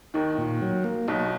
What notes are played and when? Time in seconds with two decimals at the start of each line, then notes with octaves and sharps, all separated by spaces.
0.14 D#2 D#3 D#4
0.38 A#2
0.62 F#3
0.84 A#3
1.08 B1 B2 D#4